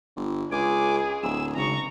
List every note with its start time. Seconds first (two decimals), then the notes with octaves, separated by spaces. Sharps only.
0.17 G1
0.52 C#2 G#4 G#5 D6
1.23 D1 E6
1.56 G#1 C#3 A#5 C#6